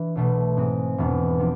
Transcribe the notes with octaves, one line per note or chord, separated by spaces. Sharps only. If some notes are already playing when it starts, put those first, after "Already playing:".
Already playing: E3 D4
B1 B2 A3
G#2 G#3 C4
E1 E2 B2 B3
F3 B3 D4